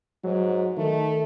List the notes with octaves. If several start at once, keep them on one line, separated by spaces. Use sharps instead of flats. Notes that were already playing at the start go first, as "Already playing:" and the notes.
G#2 F#3
D#3 A3